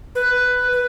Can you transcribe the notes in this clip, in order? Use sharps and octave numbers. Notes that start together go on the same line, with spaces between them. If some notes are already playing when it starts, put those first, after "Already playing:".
B4
B4